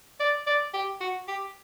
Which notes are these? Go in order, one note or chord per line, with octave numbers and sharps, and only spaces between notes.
D5
D5
G4
F#4
G4